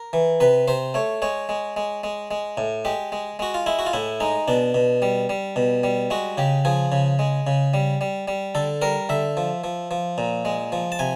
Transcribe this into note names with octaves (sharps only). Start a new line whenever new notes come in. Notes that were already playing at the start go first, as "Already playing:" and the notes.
Already playing: A#4
E3
C3 B4
C3 C5
A3 C#5
G#3 C#5
G#3
G#3
G#3
G#3
A2
G#3 G4
G#3
G#3 F#4
F4
G#3 E4
F#4
F4
A2 E4
G#3 D#4
B2 D4
B2
G3
G3
B2
G3
G#3 F#4
C#3 G4
F3 G#4
C#3
G#3
C#3
G3
G3
G3
D3 A4
G3 A#4
D3 E5
F3
F3
F3
A#2
G#3
F3
A5
C3 G#5